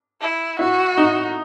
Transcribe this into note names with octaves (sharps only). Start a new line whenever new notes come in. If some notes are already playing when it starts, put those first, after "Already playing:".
E4
E4 F#4
D#4